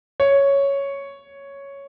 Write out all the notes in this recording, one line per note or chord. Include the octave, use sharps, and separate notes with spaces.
C#5